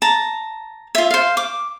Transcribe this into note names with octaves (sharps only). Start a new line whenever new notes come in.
A5 A#5
F4 E5
C5 F5
D6